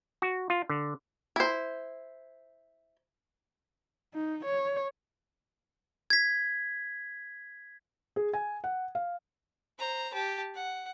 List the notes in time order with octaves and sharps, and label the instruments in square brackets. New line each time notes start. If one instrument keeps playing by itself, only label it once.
[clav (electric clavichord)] F#4
F4
D3
[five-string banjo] E4 C5
[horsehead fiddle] D#4
C#5
[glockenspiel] G#6 B6
[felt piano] G#4
G#5
F#5
F5
[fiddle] C5 A#5
G4 A5
F#5